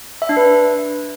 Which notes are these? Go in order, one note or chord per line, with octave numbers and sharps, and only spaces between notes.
E5
D4
B4